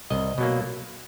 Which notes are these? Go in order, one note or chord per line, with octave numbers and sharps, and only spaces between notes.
C2 D#5
B2 F#3 A#3